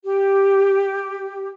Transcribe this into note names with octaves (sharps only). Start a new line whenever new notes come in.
G4